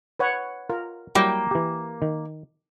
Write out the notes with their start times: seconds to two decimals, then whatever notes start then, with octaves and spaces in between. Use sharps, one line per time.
0.19 B4 C#5 F#5
0.70 F4 A#4
1.15 F#3 G3 A#3 E4 G5
1.51 E3 G4
2.02 D#3